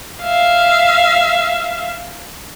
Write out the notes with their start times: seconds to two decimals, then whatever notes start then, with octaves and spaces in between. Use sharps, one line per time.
0.23 E5 F5